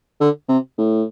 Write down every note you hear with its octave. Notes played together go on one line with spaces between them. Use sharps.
D3
C3
A2